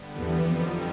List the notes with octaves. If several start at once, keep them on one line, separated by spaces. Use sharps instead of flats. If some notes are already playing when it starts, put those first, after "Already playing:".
Already playing: D3 G3 B3
E2 E3
F2 B2 F3 G3 C4 D#4